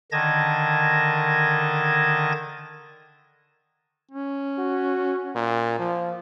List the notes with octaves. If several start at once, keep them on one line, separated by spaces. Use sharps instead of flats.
D3 D#3 D#5 A5 G#6 A#6
C#4
F#4
A#2
F3